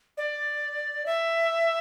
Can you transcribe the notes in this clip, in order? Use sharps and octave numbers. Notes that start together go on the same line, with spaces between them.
D5
E5